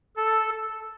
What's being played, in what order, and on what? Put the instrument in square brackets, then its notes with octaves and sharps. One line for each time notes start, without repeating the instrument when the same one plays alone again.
[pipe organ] A4